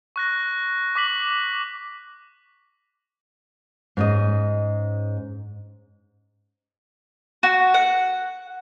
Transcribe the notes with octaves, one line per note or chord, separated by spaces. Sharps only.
C#6 F#6 A#6
C#6 D6 B6 F#7
G#2 C#4 D#5
F#4
F#5